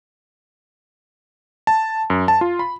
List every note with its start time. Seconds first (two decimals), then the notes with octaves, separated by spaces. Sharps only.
1.67 A5
2.10 F#2
2.28 A5
2.41 F4
2.59 B5